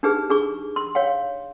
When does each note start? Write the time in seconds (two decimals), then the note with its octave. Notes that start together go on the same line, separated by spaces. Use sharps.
0.03 D4 D#4 G4 G#4 B4
0.29 D4 G#4 C#6
0.76 C6
0.95 C#5 F5 G5